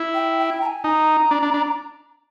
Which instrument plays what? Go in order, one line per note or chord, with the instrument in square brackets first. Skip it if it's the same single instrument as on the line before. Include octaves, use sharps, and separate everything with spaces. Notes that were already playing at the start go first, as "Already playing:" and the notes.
Already playing: [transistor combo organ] E4
[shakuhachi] G5
G5
A#5
G#5
[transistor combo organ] D#4 [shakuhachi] A#5
[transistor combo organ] D4
D4
D4